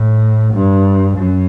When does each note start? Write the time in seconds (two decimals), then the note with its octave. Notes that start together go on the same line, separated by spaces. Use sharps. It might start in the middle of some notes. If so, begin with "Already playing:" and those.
Already playing: A2
0.53 G2
1.17 F#2